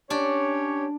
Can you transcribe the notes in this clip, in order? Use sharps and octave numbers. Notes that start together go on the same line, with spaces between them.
C#4 D4 G4 C#5 D5